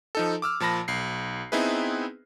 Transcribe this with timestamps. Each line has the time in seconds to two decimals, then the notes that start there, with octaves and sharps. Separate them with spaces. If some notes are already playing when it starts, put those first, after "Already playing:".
0.15 F3 D#4 A4
0.42 D6 E6 F6
0.60 A#2 F3 A5 B5 A#6
0.88 B1 C7
1.52 B3 C4 D#4 E4 G#4 B4